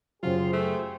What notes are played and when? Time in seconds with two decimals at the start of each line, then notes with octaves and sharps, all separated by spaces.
0.23 F#2 C#3 F#3 F4 G4 G#4 C5
0.53 A3